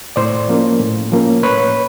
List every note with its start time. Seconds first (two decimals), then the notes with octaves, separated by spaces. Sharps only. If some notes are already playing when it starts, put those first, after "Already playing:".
0.16 A2 C5 D5
0.48 F3 A#3 C#4
0.79 A2
1.12 F3 A#3 C#4
1.43 A2 B4 C#5